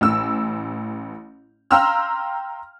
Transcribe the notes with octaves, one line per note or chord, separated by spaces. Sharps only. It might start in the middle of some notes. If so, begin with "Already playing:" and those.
A1 E6
F5 G5 A#5 C6 E6 F6